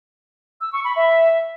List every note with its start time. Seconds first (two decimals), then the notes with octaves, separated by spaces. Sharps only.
0.61 E6
0.73 C#6
0.84 B5
0.96 E5